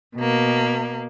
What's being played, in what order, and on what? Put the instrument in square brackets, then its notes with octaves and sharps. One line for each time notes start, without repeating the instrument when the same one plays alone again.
[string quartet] B2 A#3